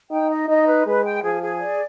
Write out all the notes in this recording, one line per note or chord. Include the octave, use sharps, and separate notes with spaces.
D#4 G5
D#5
D#4 D#5
B4
G#3 B4
G5
F3 G#4
G#4
D5